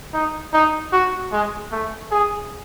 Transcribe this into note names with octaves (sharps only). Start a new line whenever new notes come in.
D#4
D#4
F#4
G#3
A3
G#4